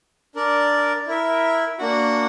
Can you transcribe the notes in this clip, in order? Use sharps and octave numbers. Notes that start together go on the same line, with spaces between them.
D4 A#4 D5
E4 A#4 E5
A#3 D4 F#4